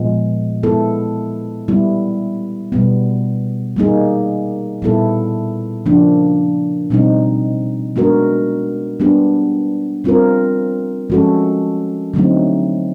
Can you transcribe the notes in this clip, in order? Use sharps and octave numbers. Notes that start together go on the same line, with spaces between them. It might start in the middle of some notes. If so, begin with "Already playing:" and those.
Already playing: A#2 F3 G#3 B3
G#3 B3 E4 A4
G3 B3 E4
B2 G3 B3
G3 A#3 D#4 G#4
A#2 G3 B3 E4 A4
C#3 F3 A#3 D4
B2 G3 C4 D#4
G#3 B3 D4 F#4 A#4
G3 B3 D4 G4
G3 C4 F4 A#4
F3 G#3 C#4 F#4 A4
D3 F#3 A3 C4 D#4